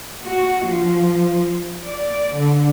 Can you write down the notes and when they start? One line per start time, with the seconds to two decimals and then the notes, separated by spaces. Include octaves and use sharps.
0.23 F#4
0.65 F3
1.84 D5
2.34 D3